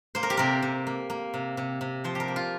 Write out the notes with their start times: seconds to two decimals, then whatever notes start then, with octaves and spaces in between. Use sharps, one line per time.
0.15 A#3 C5
0.23 A#4
0.30 G4
0.37 C3 A#4
0.62 C3
0.87 A#3
1.10 A#3
1.34 C3
1.57 C3
1.81 C3
2.04 F3 C5
2.15 G4 A#4
2.28 A#3
2.36 F4